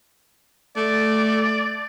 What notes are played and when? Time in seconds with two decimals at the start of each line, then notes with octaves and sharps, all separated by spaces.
0.76 A3 D5